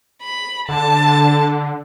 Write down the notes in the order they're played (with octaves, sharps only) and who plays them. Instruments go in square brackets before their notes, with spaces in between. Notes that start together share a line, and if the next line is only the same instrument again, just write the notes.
[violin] B5
[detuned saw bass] D3 [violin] A5